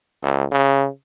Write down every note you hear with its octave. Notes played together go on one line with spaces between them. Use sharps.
C#2
C#3